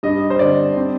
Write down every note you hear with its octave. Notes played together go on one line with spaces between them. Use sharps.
G2 D#5
C5
D3 D5
C4